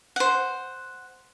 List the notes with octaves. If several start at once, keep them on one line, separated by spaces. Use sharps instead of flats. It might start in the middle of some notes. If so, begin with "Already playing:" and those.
C5 F#5